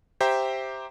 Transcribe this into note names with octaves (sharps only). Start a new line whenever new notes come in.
G4 C5 E5 G5 A#5